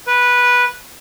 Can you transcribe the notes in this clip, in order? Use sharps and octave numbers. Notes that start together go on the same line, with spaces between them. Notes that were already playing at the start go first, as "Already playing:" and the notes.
B4